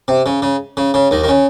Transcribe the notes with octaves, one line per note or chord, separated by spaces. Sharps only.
C3
C#3
C#3
C#3
C#3
D#2 D#3
D#3
C#3